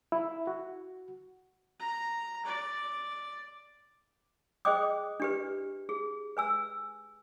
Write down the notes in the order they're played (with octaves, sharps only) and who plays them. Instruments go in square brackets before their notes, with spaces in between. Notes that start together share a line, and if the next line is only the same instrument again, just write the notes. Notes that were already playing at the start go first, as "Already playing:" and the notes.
[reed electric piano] E4
F#4
[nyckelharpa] A#5
D5
[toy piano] G#4 C5 D#5 G5 D6 D#6
D4 G4 B4
G#4
B4 G#5 E6